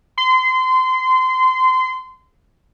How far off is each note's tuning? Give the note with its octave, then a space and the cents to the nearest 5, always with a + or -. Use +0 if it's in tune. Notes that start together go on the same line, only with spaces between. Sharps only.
C6 -25